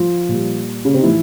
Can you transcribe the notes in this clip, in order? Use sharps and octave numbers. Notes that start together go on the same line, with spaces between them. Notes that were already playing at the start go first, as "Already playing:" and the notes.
Already playing: F3 F4
A#2 G3
C#3 C#4
C3 C4
D#4
A2 E3 F3 E4